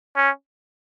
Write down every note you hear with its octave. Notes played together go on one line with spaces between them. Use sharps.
C#4